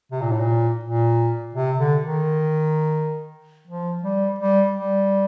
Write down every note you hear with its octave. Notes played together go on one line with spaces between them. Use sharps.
C3
A#2
A2
A#2
A#2
C3
D3
D#3
F3
G3
G3
G3